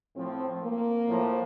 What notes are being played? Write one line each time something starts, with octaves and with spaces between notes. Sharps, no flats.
A2 F3 C4
A#3
A2 F3